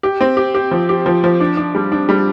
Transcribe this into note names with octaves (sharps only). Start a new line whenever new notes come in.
G4
C4
G4
G4
F3
G4
F3
F3
D4
D4
G3
D4
G3